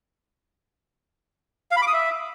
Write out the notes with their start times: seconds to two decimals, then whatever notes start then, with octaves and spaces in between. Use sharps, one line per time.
1.71 F5
1.77 B5
1.82 D6
1.87 D#6
1.93 E5